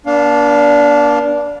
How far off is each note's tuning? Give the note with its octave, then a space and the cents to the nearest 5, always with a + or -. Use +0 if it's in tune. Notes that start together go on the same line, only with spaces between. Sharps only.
A#3 +45 D4 -15 F5 +10